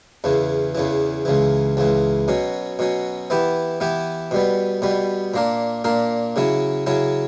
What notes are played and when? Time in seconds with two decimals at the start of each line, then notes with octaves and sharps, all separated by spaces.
0.24 E2 C#3 E3
0.75 E2 C#3 E3
1.25 C#2 C#3 E3
1.77 C#2 C#3 E3
2.28 B2 F#3 C#4
2.79 B2 F#3 C#4
3.30 E3 B3 E4 G4
3.80 E3 B3 E4 G4
4.31 B2 G3 B3
4.82 B2 G3 B3
5.34 A#2 A#3 D4 A#4
5.84 A#2 A#3 D4 A#4
6.36 C#3 F#3 C#4 E4
6.87 C#3 F#3 C#4 E4